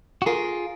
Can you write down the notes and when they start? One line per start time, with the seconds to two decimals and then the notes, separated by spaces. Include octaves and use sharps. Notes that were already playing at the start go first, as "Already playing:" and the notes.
0.22 F#4
0.26 F4 G#4 A#4